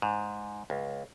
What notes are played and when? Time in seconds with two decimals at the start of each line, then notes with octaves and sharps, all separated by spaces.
0.02 G#2
0.70 C#2